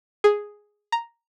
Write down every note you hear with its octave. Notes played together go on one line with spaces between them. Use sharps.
G#4
A#5